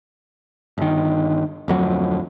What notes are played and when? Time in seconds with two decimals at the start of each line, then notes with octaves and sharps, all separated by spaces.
0.78 G1 D#3
1.68 D1 F2 F#3